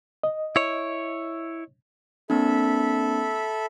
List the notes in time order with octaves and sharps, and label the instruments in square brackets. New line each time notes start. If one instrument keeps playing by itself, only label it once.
[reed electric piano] D#5
[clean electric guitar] E4 C#5
[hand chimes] A#3 C4 D4 [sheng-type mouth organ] A4 E5 B5